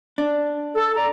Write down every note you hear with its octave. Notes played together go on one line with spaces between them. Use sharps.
D4
A4
D5 A#5